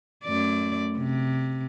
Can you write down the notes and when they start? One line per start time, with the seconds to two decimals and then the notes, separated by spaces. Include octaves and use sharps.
0.24 F#2 A3 D5
0.98 C3